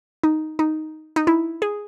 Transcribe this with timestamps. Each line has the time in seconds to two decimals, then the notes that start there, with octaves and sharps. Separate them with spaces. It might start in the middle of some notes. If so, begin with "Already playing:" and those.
0.23 D#4
0.59 D#4
1.16 D#4
1.27 E4
1.62 G#4